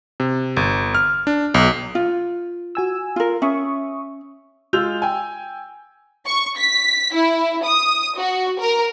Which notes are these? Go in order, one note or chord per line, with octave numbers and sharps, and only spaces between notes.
C3
G1
F6
D4
B1
F4
F#4 G#5 E6
F4 A#4
C#4 E5 C#6 D#6
G#3 F4 E6 G6 F7
G5 G#5
C#6
B6
E4
D#6
F#4
A#4